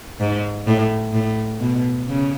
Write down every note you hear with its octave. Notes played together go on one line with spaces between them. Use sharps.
G#2
A2
A2
B2
C#3